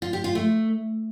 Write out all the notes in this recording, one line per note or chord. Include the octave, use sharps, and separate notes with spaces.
F4
G4
F4
A3